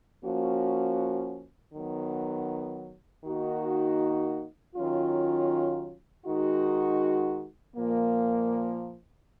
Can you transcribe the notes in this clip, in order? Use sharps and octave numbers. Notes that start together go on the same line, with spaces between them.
F3 A#3 C#4 F#4
D#3 F#3 B3
D#3 A#3 D#4 F#4
D#3 F#3 C#4 F4
D#3 G#3 D#4 F#4
A#2 F3 A#3